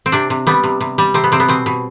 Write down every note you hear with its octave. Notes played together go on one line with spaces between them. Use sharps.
C4
C3 D4
C3
G3 B3
C3
C3
G3
C3 C4
B3
C3 C4
B3
B2 C4
B2